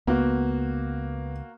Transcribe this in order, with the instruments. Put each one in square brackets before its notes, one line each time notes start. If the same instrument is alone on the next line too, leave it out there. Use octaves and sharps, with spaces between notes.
[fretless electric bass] C#2 [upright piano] A#3 F#4 [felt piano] B3